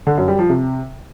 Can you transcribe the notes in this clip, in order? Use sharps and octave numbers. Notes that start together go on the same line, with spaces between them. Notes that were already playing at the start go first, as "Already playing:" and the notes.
D3
F#2
G3
F3
C3